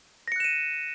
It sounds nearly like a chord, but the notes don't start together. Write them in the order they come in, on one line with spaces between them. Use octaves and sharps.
A#6 C#7 F#6 E7 D#7